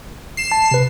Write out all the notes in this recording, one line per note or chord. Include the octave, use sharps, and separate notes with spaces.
C7 E7
A5
C3 B4